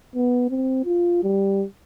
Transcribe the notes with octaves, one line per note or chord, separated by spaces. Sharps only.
B3
C4
F4
G3